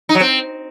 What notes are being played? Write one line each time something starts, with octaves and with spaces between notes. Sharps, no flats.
D#4
F#3
C4